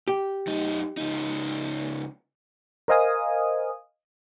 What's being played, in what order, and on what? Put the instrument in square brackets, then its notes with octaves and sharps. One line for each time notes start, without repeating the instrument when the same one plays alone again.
[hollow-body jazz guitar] G4
[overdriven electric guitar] F#2 D#4
C#2 D#4
[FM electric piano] A#4 C5 D#5 F5 G#5 D#6